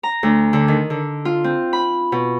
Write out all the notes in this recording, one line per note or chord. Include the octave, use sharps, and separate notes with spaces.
A#5
D2
D3
D#3
D3
F4
C4
B5
B2